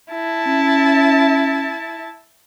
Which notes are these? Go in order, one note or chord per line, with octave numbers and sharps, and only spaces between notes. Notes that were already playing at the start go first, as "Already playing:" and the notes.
E4 A5
C#4